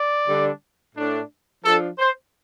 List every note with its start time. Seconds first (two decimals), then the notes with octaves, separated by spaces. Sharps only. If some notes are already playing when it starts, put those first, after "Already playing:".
Already playing: D5
0.27 D3 G3 D4
0.95 A2 A3 D4
1.64 F3 D4 A4
1.98 C5